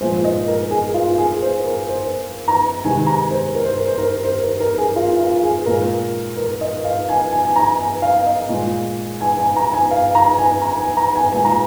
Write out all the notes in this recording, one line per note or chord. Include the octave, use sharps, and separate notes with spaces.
A#2 F3 G#3 C5
D#5
A#4
G#4
F4
G#4
C5
A#4
C5
A#5
C3 D#3 G#3 G#5
A#5
C5
A#4
C5
A#4
C5
A#4
C5
A#4
A#4
G#4
F4
F4
G#4
A#2 G#3 A#4
A#4
D#5
F5
G#5
G#5
G#5
A#5
G#5
F5
D#5
A#2 G#3
G#5
G#5
A#5
G#5
F5
A#5
G#5
A#5
G#5
A#5
G#5
A#2 G#3 G#5
A#5